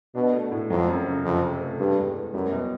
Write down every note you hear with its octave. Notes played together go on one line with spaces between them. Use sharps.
B2 D4
A3
A2
F2 F#3
F#2
C#3
F2 C3
C3
A3
G2 G#3
E2
E2
F#2 G3
B2